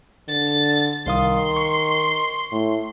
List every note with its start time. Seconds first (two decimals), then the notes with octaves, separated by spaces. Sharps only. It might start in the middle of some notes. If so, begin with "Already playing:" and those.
0.28 D3 A6
1.06 C2 D#3 F5 C6 D#6
1.57 C#6
2.52 A2